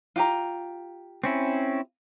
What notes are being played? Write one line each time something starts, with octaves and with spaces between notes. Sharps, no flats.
F4 G4 A#5
C4 C#4 E4